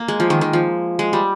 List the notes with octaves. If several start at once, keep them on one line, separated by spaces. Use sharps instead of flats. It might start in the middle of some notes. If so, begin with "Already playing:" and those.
Already playing: A#3
G#3
F3
D#3
D#3
F3
G#3
G3